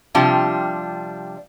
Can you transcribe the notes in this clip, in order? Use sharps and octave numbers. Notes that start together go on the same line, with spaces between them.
C3 F3 G3 D4 F4